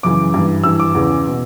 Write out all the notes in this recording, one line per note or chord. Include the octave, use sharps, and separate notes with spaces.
F#2 C#3 E3 D6
G2 E3
G2 E3 E6
D6
E2 C#3 E3
B2